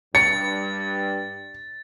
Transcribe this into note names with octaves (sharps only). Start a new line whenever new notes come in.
G2 A6 C#7